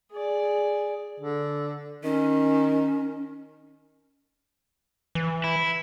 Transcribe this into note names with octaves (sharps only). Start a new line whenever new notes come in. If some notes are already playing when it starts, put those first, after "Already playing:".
G#4 D5
D3
D#3 C#4
E3
E4